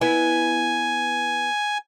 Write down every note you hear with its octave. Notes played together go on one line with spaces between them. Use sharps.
B3 E4 G#5